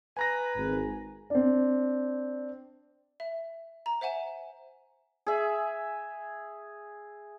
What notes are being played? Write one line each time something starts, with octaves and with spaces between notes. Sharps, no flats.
B4 G#5 A#5 A#6
G#1
C4 D4
E5
A#5
C5 E5 F#5 G#5 E7
G#4 E5